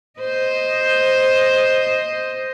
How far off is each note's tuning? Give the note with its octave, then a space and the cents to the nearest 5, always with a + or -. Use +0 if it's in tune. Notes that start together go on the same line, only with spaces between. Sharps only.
C5 +0 D#5 +0